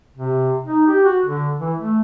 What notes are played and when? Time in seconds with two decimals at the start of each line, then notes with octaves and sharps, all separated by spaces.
0.17 C3
0.65 D#4
0.87 G4
1.05 F#4
1.26 D3
1.60 E3
1.78 A3